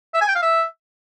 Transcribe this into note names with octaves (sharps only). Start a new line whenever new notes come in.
E5
G#5
G5
F5
E5